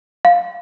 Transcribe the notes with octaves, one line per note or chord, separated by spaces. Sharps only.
F5